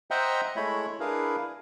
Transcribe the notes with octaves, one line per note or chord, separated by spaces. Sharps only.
C5 D#5 E5 F#5 G5 A#5
G#3 A3 E4 C#5 E5 B5
D4 E4 G#4 A#4 B4 F5